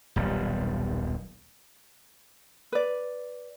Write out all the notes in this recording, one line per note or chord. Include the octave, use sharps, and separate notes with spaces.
D#1 B1 G3
B4 D5